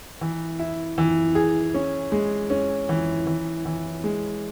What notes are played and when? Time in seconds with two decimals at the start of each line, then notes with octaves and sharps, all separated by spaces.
0.21 E3
0.59 E4
0.98 E3
1.35 G#4
1.74 C#4
2.12 G#3
2.50 C#4
2.89 E3
3.27 E3
3.65 E3
4.04 G#3